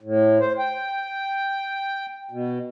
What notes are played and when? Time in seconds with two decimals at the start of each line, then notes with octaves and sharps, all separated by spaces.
0.01 A2
0.40 C5
0.59 G5
2.31 B2